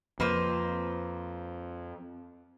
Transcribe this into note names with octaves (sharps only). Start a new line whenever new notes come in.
F2 A#3 B4 C5